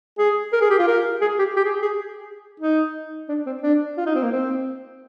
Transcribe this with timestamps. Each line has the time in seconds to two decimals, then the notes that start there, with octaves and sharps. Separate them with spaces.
0.18 G#4
0.53 A#4
0.61 G#4
0.70 G4
0.79 F4
0.87 A#4
1.21 G#4
1.39 G4
1.56 G4
1.65 G#4
1.82 G#4
2.60 D#4
3.29 D4
3.46 C4
3.63 D4
3.97 F4
4.06 D#4
4.15 C4
4.23 A#3
4.32 C4